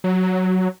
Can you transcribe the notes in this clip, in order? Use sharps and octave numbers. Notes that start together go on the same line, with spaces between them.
F#3